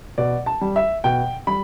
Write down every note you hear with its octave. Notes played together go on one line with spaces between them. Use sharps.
B2 D5
A5
G3
E5
B2 G5
G3 B5